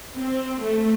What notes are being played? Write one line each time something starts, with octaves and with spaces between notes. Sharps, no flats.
C4
A3